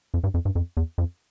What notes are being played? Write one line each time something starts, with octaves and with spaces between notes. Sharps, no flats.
F2
G2
F2
G2
F2
E2
F2